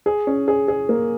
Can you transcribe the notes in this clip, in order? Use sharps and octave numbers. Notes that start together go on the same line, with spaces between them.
G#4
C#4
G#4
G#4
A#3